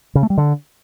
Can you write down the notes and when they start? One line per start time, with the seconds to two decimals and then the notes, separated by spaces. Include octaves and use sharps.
0.15 C#3
0.23 A3
0.30 G3
0.37 D3